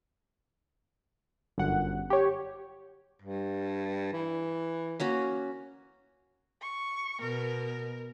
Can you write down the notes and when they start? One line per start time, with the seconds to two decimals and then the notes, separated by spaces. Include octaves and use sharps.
1.58 G1 F#2 F#5
2.10 G4 C#5
3.22 G2
4.13 E3
5.00 A#3 C#4 F#4
6.62 C#6
7.21 B2 A#4